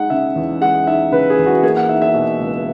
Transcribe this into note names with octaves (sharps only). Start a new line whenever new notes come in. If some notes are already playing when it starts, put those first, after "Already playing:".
Already playing: G#3 D#4 F#5
C#3 E5
E2
G#3 F#5
D#4 E5
C#3 B4
G#4
E2
F#4
A#3 G#4
F#5
D#4 E5
E5
B2
C#2